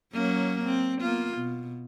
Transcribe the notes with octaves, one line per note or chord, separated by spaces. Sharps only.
F#3 A#3 C#4
C4
A#3 B3 F4
B2